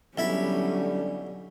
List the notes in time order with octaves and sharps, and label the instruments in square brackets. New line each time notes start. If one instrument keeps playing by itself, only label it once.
[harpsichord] B1 E4 B5 [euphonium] D3 [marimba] F#3 [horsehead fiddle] G3 C#4